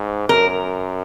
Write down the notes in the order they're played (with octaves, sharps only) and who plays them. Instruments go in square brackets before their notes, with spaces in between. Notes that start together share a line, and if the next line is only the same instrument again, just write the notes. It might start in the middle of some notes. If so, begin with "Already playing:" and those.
Already playing: [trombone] G#2
[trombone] F#2 [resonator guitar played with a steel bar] A#4